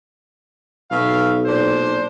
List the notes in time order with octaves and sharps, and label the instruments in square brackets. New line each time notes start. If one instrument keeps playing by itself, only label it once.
[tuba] B1 [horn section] B2 E5 F5
[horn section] A#2 D4 C5